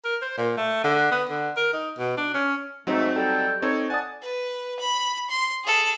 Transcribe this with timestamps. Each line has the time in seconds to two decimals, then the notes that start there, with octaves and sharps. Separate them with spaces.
0.05 A#4
0.22 C5
0.37 A#2
0.57 A3
0.84 D3
1.11 B3
1.29 D3
1.57 A#4
1.73 D#4
1.99 B2
2.17 D4
2.34 C#4
2.87 G#2 F#3 A3 C4 D#4
3.15 G3 A4 G5
3.62 C4 D#4 A4 C#5
3.90 D5 F#5 G#5 A5 D#6
4.22 B4
4.80 B5
5.30 C6
5.64 G#4 A4